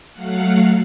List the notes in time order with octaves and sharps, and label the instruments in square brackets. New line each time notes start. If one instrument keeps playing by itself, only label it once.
[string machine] F#3 A3 F5 F#5